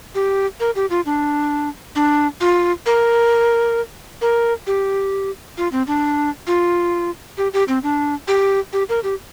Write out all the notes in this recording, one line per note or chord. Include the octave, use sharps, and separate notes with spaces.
G4
A#4
G4
F4
D4
D4
F4
A#4
A#4
G4
F4
C4
D4
F4
G4
G4
C4
D4
G4
G4
A#4
G4